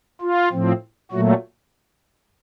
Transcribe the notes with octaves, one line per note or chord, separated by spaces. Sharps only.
F4
A2 F3 C4
A#2 F#3 A3 F#4